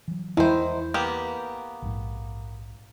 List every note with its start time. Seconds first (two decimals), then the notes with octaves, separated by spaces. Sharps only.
0.08 E3 F#3
0.37 E2 D#3 E3 G#3 E4 C5
0.94 A#3 B3 G4
1.82 A#1 G#2